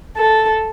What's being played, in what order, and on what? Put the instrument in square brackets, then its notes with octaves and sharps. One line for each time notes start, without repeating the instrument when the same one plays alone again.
[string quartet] A4